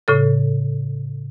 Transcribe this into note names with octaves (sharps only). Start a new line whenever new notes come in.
A2 C#3 A4